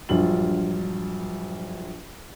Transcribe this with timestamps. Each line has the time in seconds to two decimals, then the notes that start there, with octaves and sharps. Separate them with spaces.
0.09 A#1 G2 F#3 F4 F#7